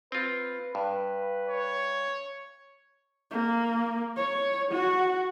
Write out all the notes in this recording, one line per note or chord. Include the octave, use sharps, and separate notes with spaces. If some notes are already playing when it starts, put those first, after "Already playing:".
C4 F4 B4
G2 B4
C#5
A#3
C#5
F#4